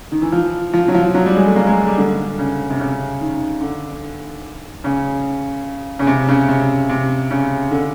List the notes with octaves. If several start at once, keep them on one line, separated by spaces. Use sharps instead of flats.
D#3
E3
F3
F3
F#3
F3
F#3
G3
G#3
A3
A#3
G#3
G3
D3
C#3
C3
C#3
D#3
D3
C#3
C#3
C3
C#3
C3
C3
C#3
D3